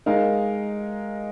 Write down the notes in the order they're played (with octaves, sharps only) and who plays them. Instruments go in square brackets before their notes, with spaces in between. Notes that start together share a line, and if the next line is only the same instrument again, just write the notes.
[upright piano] G#3 D#4 A#4 F5